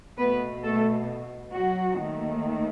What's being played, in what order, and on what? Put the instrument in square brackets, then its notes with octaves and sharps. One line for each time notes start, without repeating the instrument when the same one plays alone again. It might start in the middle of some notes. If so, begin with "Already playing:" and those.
[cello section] B2 A3 B3 B4
A3 A4
F#3 F#4
D#2 D#3 A3